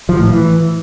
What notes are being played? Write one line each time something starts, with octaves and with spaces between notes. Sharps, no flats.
F3
A2
E3